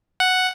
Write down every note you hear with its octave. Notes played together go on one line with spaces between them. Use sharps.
F#5